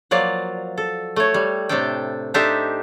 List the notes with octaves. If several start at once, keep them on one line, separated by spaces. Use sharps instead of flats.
F3 F#3 A#3 D5
A4
A3 C#5
G3
A2 C3 A3 D4 A4 G5
D4 D#4 G4 A4 C5 E5